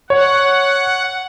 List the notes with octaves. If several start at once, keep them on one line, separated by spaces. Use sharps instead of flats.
C#5 F#5